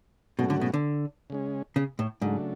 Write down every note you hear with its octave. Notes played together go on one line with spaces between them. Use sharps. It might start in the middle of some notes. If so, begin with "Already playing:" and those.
G#2 B2 F#3 A3 C#4 F#4
D3
B2
D3
C#3 G#3 C#4
C#3
A2
G#2 C#3 F#3 A3 D4